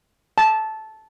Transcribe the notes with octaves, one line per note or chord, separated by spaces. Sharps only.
A5